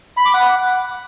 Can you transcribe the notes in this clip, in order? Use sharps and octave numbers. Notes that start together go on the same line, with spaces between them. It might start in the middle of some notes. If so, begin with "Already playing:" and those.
B5
D6
F#5